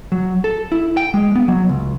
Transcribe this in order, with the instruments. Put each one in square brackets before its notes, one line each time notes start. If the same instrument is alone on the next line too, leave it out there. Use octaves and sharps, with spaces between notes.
[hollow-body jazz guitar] F#3
A4
E4
G5
G#3
B3
F#3
C#2